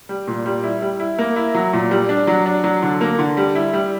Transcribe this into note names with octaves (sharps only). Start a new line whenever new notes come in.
G3
A#2
G3
E4
G3
E4
A#3
E4
F#3
A#2
G3
D4
F#3
D4
F#3
D3
A#3
D3
G3
E4
G3